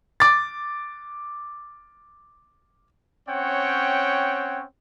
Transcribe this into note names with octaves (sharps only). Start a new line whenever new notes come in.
D6 A6
C4 C#4 C#5 F#5 G5